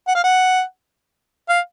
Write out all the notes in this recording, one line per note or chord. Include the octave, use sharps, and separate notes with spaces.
F#5
F5
F#5
F5